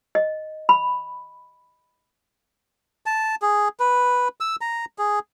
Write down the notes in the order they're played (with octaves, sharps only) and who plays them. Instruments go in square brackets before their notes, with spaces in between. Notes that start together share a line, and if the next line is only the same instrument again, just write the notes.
[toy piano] D#5
B5
[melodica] A5
G#4
B4
E6
A#5
G#4